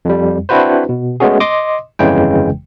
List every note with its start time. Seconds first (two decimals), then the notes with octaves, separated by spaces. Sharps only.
0.05 F2 G3
0.49 C4 D4 E4 F#4 B4 C5
0.89 B2
1.20 G#3 A3 B3 C#4 F#4 G#4
1.40 D#5 C6 D6 D#6
1.99 G1 F2 C#3 E3 G#3 G5